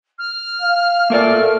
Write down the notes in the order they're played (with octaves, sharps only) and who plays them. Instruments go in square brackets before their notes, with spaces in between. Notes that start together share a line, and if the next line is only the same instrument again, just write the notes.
[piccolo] F6
[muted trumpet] F5
[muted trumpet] A3 [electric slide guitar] A#3 A#4 D5